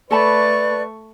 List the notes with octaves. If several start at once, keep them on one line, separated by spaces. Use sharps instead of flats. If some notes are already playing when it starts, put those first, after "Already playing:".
A3 A4 B4 D5 A5 B5 C#6